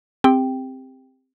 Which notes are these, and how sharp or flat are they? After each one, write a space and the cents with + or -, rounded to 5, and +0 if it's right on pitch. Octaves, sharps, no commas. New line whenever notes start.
C4 +0 G4 +30 G5 +0